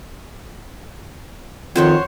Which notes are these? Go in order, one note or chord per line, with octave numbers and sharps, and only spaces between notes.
F2 D#3 F#4 C5 C#5